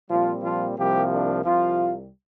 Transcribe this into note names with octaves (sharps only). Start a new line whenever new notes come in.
A#2 F3 G3 C4 F4
F3 F4
C2 C3 F3 G3 A#3 G4
D4
C2 C3 F3 G3 F4